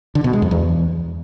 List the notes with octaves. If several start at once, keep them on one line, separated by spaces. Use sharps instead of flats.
D3
B2
G#3
F2
E2